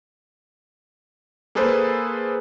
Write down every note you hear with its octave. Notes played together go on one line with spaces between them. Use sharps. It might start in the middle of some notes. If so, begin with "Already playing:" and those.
A#3 G#4 A4 B4 C5